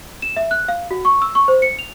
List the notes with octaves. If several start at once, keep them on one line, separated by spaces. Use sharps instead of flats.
E7
E5
F#6
F5
F#4
C#6
E6
C#6
C5
C#7
F7